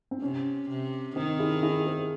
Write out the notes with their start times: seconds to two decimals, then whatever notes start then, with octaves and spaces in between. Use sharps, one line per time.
0.11 C4
0.21 C3 C#4
0.69 C3
1.16 D#3 C4 D#4
1.39 E4 G#4
1.63 E4 G#4
1.86 G#4 C5